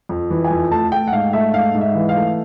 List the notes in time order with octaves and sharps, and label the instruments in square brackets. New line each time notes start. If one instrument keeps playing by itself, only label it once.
[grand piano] F2
E3
G#5
F2
A3 A5
A3 G5
F#5
G#2 F5
A3 E5
G#2 F5
G#2
E5
E3
F5
A3